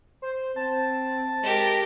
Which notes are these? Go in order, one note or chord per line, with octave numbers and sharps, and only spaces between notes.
C5
C4 A5
G#3 G4 A#4